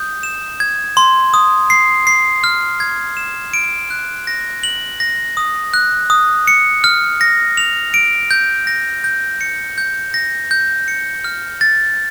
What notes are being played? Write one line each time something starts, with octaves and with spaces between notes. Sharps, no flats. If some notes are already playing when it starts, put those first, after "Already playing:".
Already playing: D#6 G6
E7
G#6
C6
D#6
C7
C7
F6
G#6
E7
D7
F#6
A#6
F#7
A#6
D#6
F#6
D#6
C#7
F6
A#6
F7
D7
G6
A#6
G6
C#7
G6
A#6
G6
C#7
F6
A6